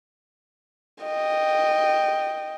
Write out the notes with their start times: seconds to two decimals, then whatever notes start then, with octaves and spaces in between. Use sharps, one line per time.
1.03 D#5 G5